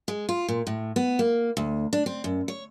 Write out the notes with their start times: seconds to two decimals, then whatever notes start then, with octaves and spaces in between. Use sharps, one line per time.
0.08 G#3
0.29 F4
0.48 A#2
0.67 A2
0.96 B3
1.19 A#3
1.57 D2
1.93 D4
2.06 C4
2.24 F#2
2.48 C#5